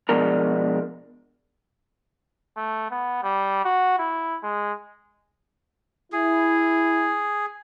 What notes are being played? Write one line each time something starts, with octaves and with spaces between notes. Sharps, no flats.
B2 F3 G#3 D4 A#4
A3
B3
G3
F#4
E4
G#3
E4 G#4